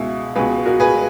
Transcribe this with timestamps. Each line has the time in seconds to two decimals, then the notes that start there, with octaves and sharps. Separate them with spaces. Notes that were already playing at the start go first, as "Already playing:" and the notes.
Already playing: C#2 B2 E4 G#4
0.36 C#2 B2 G#4 B4
0.66 F#4 A#4
0.80 G#4 B4